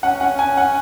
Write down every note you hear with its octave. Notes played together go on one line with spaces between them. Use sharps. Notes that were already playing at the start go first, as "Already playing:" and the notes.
C#4 F#5
C#4 F#5
C#4 G#5
C#4 F#5